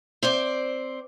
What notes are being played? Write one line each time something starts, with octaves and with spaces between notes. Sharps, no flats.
C4 C5 D5